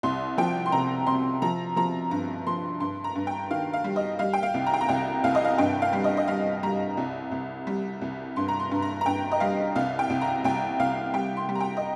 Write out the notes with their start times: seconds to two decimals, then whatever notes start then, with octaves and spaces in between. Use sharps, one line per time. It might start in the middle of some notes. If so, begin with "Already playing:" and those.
0.03 C2 C6
0.38 F3 G5
0.66 C6
0.72 C3 A#5
1.07 C3 C6
1.42 F3 A#5
1.76 F3 A#5
2.11 G2 A#5
2.46 F3 C6
2.80 G2 C6
3.04 A#5
3.15 G2
3.27 G5
3.51 D#3 F5
3.73 F5
3.84 G3
3.96 D#5
4.19 G3 F5
4.33 G5
4.43 F5
4.54 C2
4.67 A#5
4.74 G5
4.81 A#5
4.89 C2 G5
5.24 C2 F5
5.35 D#5
5.45 F5
5.58 G2 G5
5.82 F5
5.93 G3
6.04 D#5
6.17 D#5
6.28 G3 F5
6.63 G3 A#5
6.97 C2
7.32 C2
7.67 G3
8.01 C2
8.36 G2 C6
8.48 A#5
8.60 C6
8.71 G2
8.82 A#5
9.01 A#5
9.06 G2 G5
9.32 D#5
9.40 G3 F5
9.75 C2 F5
9.99 G5
10.10 C2
10.21 A#5
10.44 C2 G5
10.79 C2 F5
11.13 G3 G5
11.37 C6
11.49 G3
11.55 A#5
11.60 G5
11.77 D#5